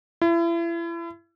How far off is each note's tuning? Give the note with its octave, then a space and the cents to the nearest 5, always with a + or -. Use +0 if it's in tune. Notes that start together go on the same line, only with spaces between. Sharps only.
E4 +35